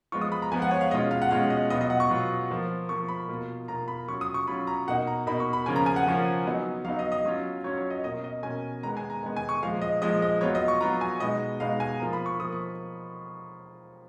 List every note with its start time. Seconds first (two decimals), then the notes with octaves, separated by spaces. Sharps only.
0.12 F3 G#3 B3 F4 C#6
0.21 D#6
0.32 B5
0.42 A#5
0.52 F3 G#3 B3 F4 G#5
0.62 F#5
0.71 C#5
0.81 F5
0.91 B2 G#3 C#4 F4 D#5
1.11 F5
1.22 F#5
1.31 B2 G#3 C#4 F4 F5
1.50 D#5
1.70 B2 F#3 B3 F4 D#5
1.81 D#5
1.90 F#5
2.00 C#6
2.09 B2 F#3 B3 F4
2.50 F3 A#3 F4
2.89 F3 A#3 F4 C#6
3.08 B5
3.28 B2 A#3 F4
3.68 B2 A#3 F4 A#5
3.88 B5
4.08 F#3 C#4 F4 C#6
4.21 D#6
4.34 C#6
4.47 F#3 C#4 F4 B5
4.67 A#5
4.87 B2 A#3 D#4 F#5
5.07 A#5
5.27 B2 A#3 D#4 B5
5.40 C#6
5.53 B5
5.66 C#3 F3 A#3 C#4 F4 G#5
5.76 A#5
5.86 G#5
5.96 F#5
6.06 C#3 F3 A#3 C#4 F4
6.45 F#3 B3 D#4
6.85 F#3 F5
6.87 B3 D#4
6.99 D#5
7.12 D#5
7.24 F#3 C#4 F4
7.64 F#3 C#4 F4 C#5
7.78 C#5
7.90 D#5
8.04 B2 A#3 C#4 D#5
8.24 D#5
8.43 B2 A#3 C#4 G#5
8.83 D#3 G#3 B3 A#5
8.97 G#5
9.10 A#5
9.23 D#3 G#3 B3
9.37 G#5
9.49 C#6
9.63 A#2 F3 G#3 F5
9.82 D#5
10.02 A#2 F3 G#3 D#5
10.22 D#5
10.41 F#3 B3 F4 C#5
10.55 D#5
10.68 C#6
10.80 F#3 B3 F4 A#5
11.01 G#5
11.20 B2 G#3 B3 D#4 D#5
11.60 B2 G#3 B3 D#4 F5
11.80 G#5
12.00 F3 A#3 F4 A#5
12.13 B5
12.26 C#6
12.39 F3 A#3 F4 D#6
12.53 C#6